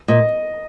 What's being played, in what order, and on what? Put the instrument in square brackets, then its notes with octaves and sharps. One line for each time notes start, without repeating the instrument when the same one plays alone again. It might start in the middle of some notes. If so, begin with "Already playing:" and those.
[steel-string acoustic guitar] A#2 [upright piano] D#5